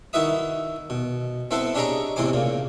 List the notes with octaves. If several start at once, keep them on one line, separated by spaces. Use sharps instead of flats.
D#3 E4 F#4 B4 E5 D#6
B2
B3 C4 E4 A4 B4 C5
C#4 D4 G4 G#4 D#5 A#5
E2 A2 C3 C5 G#5 D6
A#2 C#3